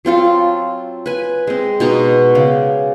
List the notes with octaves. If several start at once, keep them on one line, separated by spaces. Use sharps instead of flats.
F#3 C4 F4 A4
B4 G#5
G#3 C4
B2 D#4 A#5 C#6
C#3 D5